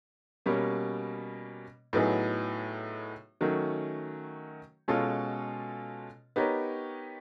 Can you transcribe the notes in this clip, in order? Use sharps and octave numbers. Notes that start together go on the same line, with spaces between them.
B2 G3 A#3 C#4
A2 F#3 B3 D#4 G#4
D#3 F#3 A3 C#4
B2 G#3 C#4 F4 A4
B3 D#4 G4 A#4 C#5